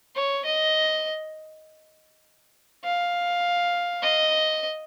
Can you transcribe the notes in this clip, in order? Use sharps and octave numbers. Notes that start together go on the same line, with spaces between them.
C#5
D#5
F5
D#5